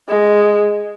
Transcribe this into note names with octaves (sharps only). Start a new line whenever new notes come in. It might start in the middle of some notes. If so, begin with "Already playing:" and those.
G#3